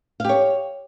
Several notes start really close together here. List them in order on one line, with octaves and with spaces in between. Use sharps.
F5 G4 C#5